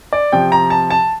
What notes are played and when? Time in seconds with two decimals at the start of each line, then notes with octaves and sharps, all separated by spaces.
0.13 D5
0.32 C3 F3 G5
0.52 A#5
0.70 A5
0.90 A5